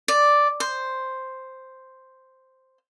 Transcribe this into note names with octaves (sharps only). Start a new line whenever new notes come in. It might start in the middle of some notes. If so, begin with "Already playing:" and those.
D5
C5